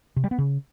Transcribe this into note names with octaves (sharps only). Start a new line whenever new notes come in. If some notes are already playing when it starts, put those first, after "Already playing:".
C3
G3
B3
C#3